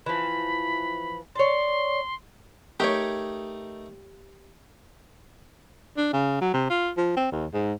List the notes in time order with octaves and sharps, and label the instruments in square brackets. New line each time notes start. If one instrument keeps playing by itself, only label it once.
[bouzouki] E3 F3 [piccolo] B5
[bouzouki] C#5 D5 [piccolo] C6
[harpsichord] A3 D#4 A#4 [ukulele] G4 C#5
[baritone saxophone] D4
C#3
F#3
C3
F4
F3
C4
D#2
G#2